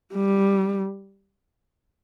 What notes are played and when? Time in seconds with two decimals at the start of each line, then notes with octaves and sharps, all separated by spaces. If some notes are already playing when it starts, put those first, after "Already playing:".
0.14 G3